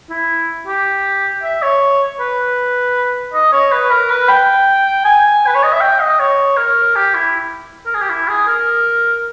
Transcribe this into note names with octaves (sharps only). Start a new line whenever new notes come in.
E4
G4
E5
C#5
B4
D#5
C#5
B4
A#4
B4
G5
G#5
B4
C#5
D#5
E5
G5
D#5
C#5
A#4
G4
E4
A#4
G#4
G4
E4
G#4
A#4